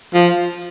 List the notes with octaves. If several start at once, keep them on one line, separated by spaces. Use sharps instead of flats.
F3